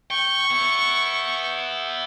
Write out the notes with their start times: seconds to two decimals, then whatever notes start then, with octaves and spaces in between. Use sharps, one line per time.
0.11 G5 C#6
0.51 B3 E4